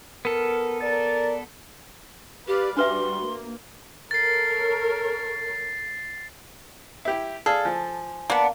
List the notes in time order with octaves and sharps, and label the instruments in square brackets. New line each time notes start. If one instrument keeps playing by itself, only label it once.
[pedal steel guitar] B3 A4 [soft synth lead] A#4
[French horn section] A#4 D5 [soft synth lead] A6
[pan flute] G4 [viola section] B4 D5 F5
[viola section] G3 F#4 [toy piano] D4 B4 E5 [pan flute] C6
[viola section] A#3
[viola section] A4 A#4 C#5 [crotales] A6 C7
[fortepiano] E4 G4
[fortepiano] G#4 [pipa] A4 [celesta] D5 F5 F6
[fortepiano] F3 [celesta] G#5
[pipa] A#3 [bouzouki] B3 D4